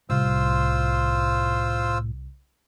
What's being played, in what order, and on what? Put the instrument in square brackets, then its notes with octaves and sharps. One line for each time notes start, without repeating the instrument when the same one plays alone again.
[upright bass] C2 [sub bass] A2 [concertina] F4 C5 E6